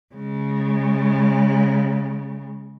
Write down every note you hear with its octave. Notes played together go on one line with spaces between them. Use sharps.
C#3 G#3